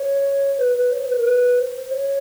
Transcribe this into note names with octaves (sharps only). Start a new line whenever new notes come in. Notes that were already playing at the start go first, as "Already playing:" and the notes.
Already playing: C#5
B4
B4
C#5
C5
B4
A#4
B4
C5
C#5